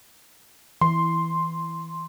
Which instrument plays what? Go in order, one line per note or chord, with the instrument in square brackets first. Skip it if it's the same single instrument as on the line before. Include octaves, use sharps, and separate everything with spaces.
[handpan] E3 [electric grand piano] C6